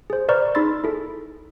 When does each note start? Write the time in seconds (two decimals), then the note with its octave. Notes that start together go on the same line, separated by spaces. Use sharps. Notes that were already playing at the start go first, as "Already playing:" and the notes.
0.10 G#4 C5
0.29 B4 C5 D5 A#5 C#6 F6
0.55 D#4 G#4 B5 C6 E6 A6
0.84 E4 G#4 A4